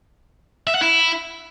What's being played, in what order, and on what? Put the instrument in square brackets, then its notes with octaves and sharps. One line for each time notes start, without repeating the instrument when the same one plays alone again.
[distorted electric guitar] E5
F#5
E4